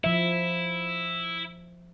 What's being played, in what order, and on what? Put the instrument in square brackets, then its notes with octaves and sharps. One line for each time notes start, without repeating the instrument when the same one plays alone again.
[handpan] F3 E5 [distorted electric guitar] E4